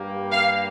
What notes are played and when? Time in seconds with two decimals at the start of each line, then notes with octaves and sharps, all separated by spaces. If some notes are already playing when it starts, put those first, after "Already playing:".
Already playing: G2 G3 A#3 G4
0.32 F5